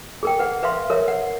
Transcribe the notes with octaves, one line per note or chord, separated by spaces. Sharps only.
G#4 A#4 G5
B4 F#5
B4 E5 F5 C6
A#4 C#5 E5
F#5